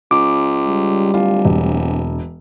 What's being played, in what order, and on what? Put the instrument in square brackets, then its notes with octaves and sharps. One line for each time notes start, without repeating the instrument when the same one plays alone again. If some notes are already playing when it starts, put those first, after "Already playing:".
[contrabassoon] C#2 [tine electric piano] D6
[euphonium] G3
[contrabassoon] D1 [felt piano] F4
[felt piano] E1